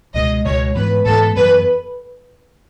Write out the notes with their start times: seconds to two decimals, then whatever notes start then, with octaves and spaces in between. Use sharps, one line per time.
0.14 C#2 B2 G#3 D#5
0.45 C#2 B2 G#3 C#5
0.75 G#2 E3 B3 B4
1.05 G#2 E3 B3 A4
1.36 F#2 E3 B3 B4